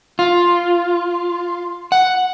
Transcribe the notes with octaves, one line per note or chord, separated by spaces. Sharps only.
F4
F#5